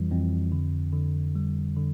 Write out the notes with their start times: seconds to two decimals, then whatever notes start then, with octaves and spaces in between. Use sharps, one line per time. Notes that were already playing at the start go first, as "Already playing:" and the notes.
Already playing: F2 E3 G3
0.11 F2
0.52 D3
0.93 D3
1.35 G3
1.76 D3